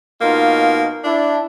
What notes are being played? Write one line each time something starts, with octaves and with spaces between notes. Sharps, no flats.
B2 A#3 D#4 F4
D4 E4